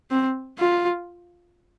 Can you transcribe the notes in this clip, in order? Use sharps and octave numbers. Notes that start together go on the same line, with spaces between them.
C4
F4